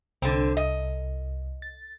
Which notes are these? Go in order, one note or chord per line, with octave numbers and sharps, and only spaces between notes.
C2 D3 C4
D#5
A6